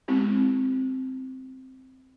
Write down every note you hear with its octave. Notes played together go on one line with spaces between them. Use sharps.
G#3 B3 C4 E4 G4